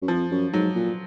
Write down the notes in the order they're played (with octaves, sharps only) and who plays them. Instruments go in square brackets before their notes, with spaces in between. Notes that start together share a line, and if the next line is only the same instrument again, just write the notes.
[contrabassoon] F#2
[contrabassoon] F2 [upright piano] F3
[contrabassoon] F#2
[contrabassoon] G#2 [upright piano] F#3
[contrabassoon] A#2